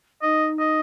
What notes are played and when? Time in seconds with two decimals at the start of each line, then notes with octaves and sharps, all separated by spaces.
0.22 D#4 D#5
0.59 D#5